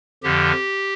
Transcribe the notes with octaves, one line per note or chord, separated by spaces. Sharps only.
F2 D3 F3 G4